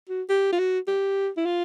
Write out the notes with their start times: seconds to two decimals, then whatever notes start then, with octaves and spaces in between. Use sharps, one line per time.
0.09 F#4
0.30 G4
0.53 F4
0.59 F#4
0.88 G4
1.37 E4
1.46 F4